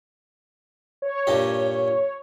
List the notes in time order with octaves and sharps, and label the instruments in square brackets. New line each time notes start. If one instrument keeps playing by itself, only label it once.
[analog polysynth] C#5
[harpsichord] G2 A#2 G4